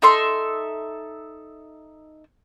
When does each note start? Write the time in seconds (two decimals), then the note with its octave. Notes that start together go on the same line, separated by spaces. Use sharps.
0.02 D#4 A4 E5 C6